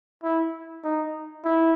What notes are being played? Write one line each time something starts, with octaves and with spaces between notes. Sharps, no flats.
E4
D#4
E4